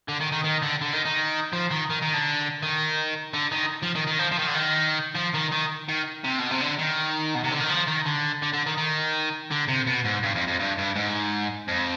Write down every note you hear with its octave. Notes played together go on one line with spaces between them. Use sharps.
D3
D#3
D#3
D#3
D3
D3
D#3
D#3
F3
D#3
D#3
D#3
D3
D#3
D3
D#3
F3
D#3
D#3
F3
F3
D#3
D3
D#3
F3
D#3
D#3
D#3
C3
B2
C3
D3
D#3
B2
C3
D3
D#3
F3
D#3
D3
D3
D3
D#3
D#3
D3
C3
B2
G#2
G2
F2
F2
G2
G2
G#2
F2